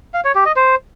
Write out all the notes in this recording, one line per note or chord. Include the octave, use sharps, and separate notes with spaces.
F5
C#5
G4
D#5
C5